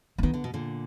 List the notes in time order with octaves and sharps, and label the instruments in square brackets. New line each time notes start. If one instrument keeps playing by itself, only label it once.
[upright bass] A#3
[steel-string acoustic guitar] D#3 [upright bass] B3
[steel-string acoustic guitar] D3
B2
A#2 D3